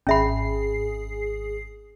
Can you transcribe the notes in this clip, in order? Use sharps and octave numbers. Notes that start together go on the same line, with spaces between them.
G#1 C#4 G#4 E5 B5 C7